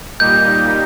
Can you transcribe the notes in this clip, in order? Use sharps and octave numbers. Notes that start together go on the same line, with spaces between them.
A#2 G3 A#3 D#4 G4 G6